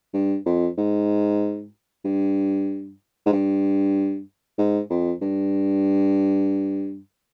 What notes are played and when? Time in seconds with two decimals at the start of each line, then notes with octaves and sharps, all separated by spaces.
0.14 G2
0.46 F2
0.78 G#2
2.05 G2
3.26 G#2
3.32 G2
4.58 G#2
4.90 F2
5.21 G2